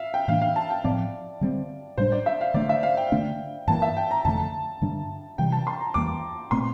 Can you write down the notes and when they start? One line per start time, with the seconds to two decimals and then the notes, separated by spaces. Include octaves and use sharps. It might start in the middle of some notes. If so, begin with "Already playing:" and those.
Already playing: E5 F5
0.14 G5
0.28 A2 E3 A#3 D4 F5
0.42 F5
0.56 A5
0.70 G5
0.84 A2 F3 C4 D5
1.41 D3 G3 C4
1.97 A2 G3 D4 C5
2.12 D5
2.26 E5
2.41 F5
2.54 D3 A3 D4 D5
2.69 E5
2.83 F5
2.97 G5
3.12 D3 A3 D4
3.67 G2 E3 A#3 A5
3.82 E5
3.97 G5
4.11 A#5
4.25 F2 D3 A3 A5
4.82 G2 D3 G3 D4
5.38 C3 E3 G3 G5
5.52 A5
5.67 C6
5.81 A#5
5.94 E2 E3 G3 A#3 D6
6.51 A#2 A3 C4 C6